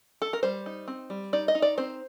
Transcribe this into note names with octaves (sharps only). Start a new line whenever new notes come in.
A4
A#4
G3 C5
D#4
C4
G3
D#4 D5
D#5
D#4
D5
C4 C5